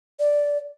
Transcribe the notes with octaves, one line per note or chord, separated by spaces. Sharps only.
D5